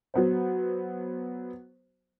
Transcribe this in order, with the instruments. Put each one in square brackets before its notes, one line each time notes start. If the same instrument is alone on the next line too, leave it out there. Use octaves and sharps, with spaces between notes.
[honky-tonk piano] F#3 B3 C5